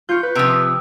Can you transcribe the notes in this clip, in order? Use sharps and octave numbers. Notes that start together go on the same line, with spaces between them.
F4 C#6 G6
B4
C3 F3 D#6 E6 D7